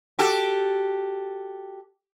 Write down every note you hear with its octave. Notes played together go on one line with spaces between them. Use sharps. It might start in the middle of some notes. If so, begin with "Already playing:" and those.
F#4 G4 A4